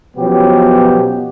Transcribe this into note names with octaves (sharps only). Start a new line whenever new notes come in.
B2 F3 F#3 B3 C#4 G4